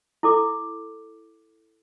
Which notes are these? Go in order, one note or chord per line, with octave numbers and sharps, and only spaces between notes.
E4 A4 D6